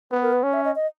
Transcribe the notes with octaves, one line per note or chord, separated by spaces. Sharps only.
B3 B4
A#4
B4
C#4 C#5
E5
D#5
D#5